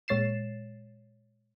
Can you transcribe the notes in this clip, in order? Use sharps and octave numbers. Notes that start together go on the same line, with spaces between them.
A#2 G#3 C#5 A6 C7 E7